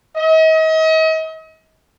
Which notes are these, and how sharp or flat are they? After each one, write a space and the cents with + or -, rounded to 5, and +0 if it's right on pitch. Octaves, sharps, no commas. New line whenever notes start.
D#5 +40